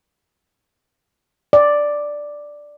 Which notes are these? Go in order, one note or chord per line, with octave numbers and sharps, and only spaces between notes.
D5